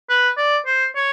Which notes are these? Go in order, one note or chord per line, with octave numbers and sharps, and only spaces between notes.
B4
D5
C5
C#5